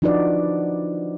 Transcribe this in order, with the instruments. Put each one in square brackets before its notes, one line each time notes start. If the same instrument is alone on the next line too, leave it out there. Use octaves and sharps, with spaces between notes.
[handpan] F3 D4 D#4 F#4 B4 D5